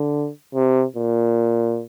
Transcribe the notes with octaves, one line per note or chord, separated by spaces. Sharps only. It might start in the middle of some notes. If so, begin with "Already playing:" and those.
Already playing: D3
C3
A#2